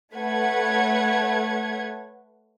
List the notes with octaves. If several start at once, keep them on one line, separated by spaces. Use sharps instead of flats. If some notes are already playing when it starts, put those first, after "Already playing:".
A3 B4 C#5 F#5 G#6